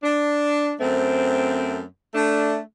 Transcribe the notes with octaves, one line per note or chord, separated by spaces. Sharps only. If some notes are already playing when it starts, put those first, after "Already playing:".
D4
F#2 A3 C4
A3 D4